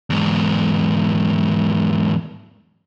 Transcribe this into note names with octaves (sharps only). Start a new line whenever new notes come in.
E2 G#2